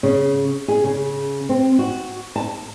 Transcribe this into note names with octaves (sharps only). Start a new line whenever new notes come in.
C#3
G#4
C#3
C4
F#4
A5